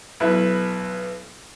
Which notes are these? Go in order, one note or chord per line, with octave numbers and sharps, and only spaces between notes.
B1 E4 B4